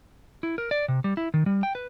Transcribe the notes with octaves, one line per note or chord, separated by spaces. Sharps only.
E4
A#4
D5
C3
G3
E4
D#3
G3
G5
B4